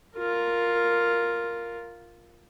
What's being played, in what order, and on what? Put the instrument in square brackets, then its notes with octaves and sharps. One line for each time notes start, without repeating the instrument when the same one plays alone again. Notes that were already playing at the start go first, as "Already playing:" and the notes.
[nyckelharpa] F4 A#4